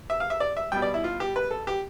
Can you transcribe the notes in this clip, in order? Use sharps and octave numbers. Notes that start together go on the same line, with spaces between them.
E5
F5
E5
D5
E5
B2 G3 G5
D5
E4
F4
G4
B4
A4
G4